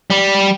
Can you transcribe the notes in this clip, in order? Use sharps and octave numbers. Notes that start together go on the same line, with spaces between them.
G3